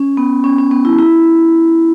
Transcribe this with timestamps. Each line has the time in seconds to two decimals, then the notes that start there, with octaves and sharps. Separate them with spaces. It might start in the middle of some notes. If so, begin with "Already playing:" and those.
Already playing: C#4
0.17 B3
0.44 C#4
0.58 C#4
0.71 B3
0.85 E4
0.98 E4